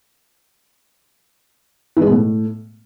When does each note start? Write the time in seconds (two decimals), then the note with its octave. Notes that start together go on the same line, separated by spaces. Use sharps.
1.97 E3
2.02 G#3
2.07 B2
2.12 A2